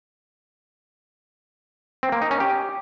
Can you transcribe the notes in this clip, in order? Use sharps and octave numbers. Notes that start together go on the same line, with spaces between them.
C4
A#3
D#4
C#4
G4